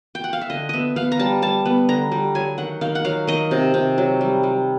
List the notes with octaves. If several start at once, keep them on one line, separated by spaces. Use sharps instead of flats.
G5
F#5
F5
E5
D3 D#5
B3 D#5 E5
B3 F5
A#5
G3 A5
G3 A5
B3
D3 A#5
G3
F#3 G#5
D#3 F#5
D#3 F5
F#5
F#3 F5
D#3 D#5
C3
C3
F#3
G3
G3